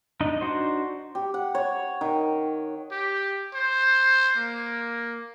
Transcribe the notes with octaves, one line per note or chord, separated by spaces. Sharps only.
D4 D#4 D#5
D4 D#4 F#4 C5
G4
F#5
C#5
D#3
G4
C5
A#3